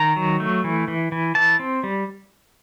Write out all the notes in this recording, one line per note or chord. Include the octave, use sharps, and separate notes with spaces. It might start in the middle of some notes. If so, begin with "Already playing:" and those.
Already playing: D#3 A#5
F#3
A3
E3
E3
E3
E3 A5
C4
G3